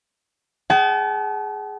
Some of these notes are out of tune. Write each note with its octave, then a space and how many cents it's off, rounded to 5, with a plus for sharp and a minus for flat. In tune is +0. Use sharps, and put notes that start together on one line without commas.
G#4 +0 F#5 +45 A5 -35